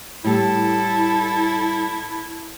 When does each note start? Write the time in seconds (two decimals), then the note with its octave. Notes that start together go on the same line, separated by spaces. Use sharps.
0.24 A2 G3 A3 E4 A4